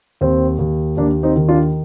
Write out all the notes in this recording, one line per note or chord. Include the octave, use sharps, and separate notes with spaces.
D#2 C4
D#2
D#2 A#3 D4
C4 D#4
D#3
D4 F4